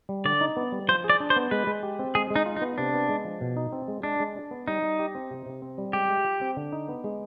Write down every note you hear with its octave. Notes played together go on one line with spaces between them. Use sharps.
G3
D3 D5
D#4
B3
G3
F3 C5
G#4
D5
D4
C5
B3
G#3 B4
G#3
G4
C4
G#3 G#4
G#3
D#4
F4
D#4
B3
C3 D4
B3
G#3
F3
B2
D#4
C4
G#3
G#3 D4
G#3
D4
B3
G3 D#4
G3
G4
C4
C3
C3
C4
G3
G#3 G4
G#3
F4
C4
D3
D#4
B3
G#3